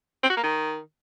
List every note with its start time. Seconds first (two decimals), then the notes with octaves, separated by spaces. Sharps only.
0.23 C4
0.30 F#4
0.37 A#3
0.43 D#3